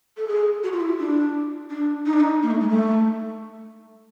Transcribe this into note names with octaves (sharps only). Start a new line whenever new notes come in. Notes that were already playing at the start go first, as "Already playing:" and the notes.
A4
G#4
F#4
F4
E4
D4
D4
D#4
D4
D#4
A#3
A3
G#3
A3